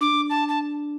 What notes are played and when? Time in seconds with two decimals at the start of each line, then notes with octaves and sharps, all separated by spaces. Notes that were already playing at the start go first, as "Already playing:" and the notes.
0.01 D4 D6
0.30 A5
0.49 A5